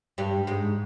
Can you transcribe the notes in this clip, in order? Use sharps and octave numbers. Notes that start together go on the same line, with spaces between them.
G2 G3
G#2 G#3